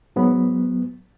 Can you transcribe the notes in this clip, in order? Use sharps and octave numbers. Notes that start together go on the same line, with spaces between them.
G#2 F#3 B3